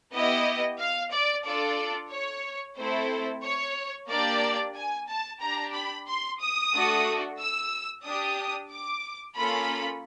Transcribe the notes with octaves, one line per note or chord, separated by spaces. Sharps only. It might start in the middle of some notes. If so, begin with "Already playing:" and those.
B3 E4 G4 D#5
F5
D5
D4 F4 A4 D5
C#5
A3 C4 E4 A4 C5
C#5
A#3 D4 G4 D5
G#5
A5
D4 G4 A#5
B5
C6
D#6
A3 D4 F#4 A4
E6
D4 G4 D#6
D6
A#3 C#4 F4 A4 B5